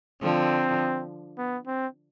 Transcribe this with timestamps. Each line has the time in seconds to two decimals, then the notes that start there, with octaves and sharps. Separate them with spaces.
0.22 D3 F3 C4
1.38 B3
1.67 C4